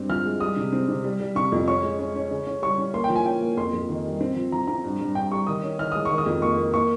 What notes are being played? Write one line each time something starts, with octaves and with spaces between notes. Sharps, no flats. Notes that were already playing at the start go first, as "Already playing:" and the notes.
Already playing: G2 C4
F3 F6
G#3
G3 D#6
C3
C4
C3
G3
G3
C3 C#6
F2
C#4 C#6
G#3
C#4
C#4
C#3
C#4
G3 C#6
C#4
A#3 C6
G5
F3
G#5
C#4 G5
A#3
F2 C6
F2
D#3
G3
C4
F3
F3 A#5
C4 A#5
G2
G2
G2 G5
G3 C#6
D#3 D#6
C#4
D#3 F6
G#3 D#6
C#6
D#3
D#6
F2
A#3 C#6
A#3
A#3 C#6